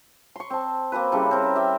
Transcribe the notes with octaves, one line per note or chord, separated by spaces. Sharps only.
C6 C#6
C4 A5
A#3 C4 F#4 B4
C#3 G3 E4 A4
C4 A#4
G4 E5 G5